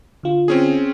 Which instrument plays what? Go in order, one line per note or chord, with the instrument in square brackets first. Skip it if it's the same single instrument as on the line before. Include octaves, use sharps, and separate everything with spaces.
[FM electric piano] D3 F4
[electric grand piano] C4 C#4 G#4